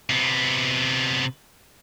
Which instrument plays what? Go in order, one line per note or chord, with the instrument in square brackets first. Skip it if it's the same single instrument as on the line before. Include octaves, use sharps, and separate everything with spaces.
[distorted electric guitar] C3 B3